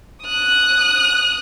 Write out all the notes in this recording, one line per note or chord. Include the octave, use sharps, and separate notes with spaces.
D#6 F#6